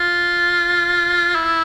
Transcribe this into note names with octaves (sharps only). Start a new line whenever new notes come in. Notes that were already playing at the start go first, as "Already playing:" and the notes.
Already playing: F4
E4